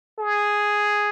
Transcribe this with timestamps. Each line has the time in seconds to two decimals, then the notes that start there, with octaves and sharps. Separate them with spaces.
0.19 G#4